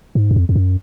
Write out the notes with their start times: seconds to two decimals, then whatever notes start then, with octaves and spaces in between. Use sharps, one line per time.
0.15 G#2
0.31 F#2
0.36 F2
0.49 F2
0.56 F#2